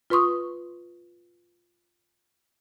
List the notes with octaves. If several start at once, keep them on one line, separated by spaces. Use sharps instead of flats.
F4 B4 C6 C#6 D#6